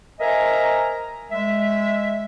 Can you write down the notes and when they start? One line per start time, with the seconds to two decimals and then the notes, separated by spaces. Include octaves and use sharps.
0.20 A#4 C5 D#5 E5 G#5 A#5
1.30 G#3 E5